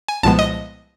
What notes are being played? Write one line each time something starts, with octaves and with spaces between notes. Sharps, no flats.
G#5
C2 A#2 F3 G#3 B3 A5
D#5